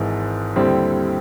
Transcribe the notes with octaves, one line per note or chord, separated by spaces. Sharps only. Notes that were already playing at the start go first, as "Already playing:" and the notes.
Already playing: G#1 G#2 E3
D#2 D3 G3 C4 E4